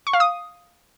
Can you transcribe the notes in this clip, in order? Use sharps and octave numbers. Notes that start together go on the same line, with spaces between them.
C#6
F5
D#6